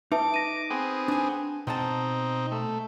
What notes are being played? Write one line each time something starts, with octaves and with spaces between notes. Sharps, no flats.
D#4 B4 E5 A5 D6
A#6 D#7
B3 C4 G#4
D4 G#5
B2 C4 D#4 F#5 A5
A3